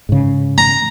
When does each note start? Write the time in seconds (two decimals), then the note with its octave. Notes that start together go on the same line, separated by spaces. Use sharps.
0.09 G#2 C#3
0.58 A#5